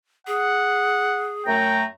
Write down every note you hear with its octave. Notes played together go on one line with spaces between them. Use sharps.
G#4 F#5
F#2 A3 G5 A#5